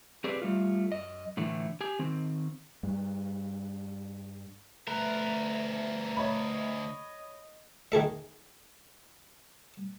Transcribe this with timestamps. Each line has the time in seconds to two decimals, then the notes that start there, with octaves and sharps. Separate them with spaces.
0.24 C4 G4 G#4 B4 D5
0.42 G3 A3 F4
0.92 F#2 D#5
1.37 A2 D3 E3 A3
1.81 G4 G#5
1.99 D#3 C4
2.83 G2 G3 G#3
4.87 D2 A3 A#4 B4
6.17 C#5 D#5 B5
7.92 D#3 G#4 A4 E5